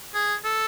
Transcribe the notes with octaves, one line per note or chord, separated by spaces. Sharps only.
G#4
A4